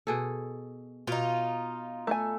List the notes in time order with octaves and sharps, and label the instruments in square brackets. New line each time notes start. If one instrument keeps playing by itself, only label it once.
[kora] B2 G#4 A4
[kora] B2 [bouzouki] D#4 F4
[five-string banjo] A3 A4 G#5